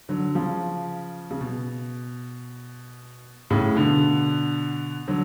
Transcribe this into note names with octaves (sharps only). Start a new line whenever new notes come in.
D3 F#3
C#3 F3
C#3
B2
A2 C#3
B2 D3
D3 F#3